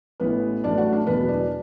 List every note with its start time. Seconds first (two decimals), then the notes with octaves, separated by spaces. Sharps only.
0.20 A1 A2 E3 B3 B4
0.64 A1 A2 F#3 D4 D5
0.78 F#4 F#5
0.93 D4 D5
1.07 E1 E2 B2 F#3 B3 B4
1.28 D4 D5